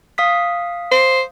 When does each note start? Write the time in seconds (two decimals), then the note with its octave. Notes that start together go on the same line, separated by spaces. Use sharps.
0.18 F5 D#6 B6
0.91 C5